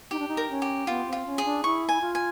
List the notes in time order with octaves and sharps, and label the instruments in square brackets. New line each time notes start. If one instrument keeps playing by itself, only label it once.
[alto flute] D#4 [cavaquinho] G4
[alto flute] D4
D#4
[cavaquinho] A#4
[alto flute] C#4
[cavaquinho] G4
[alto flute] B3 [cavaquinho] F4
[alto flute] C4
[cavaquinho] F4
[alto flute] C#4
[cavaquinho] G#4
[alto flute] D4
[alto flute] E4 [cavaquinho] C#6
[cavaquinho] G#5
[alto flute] F4
[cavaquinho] G#5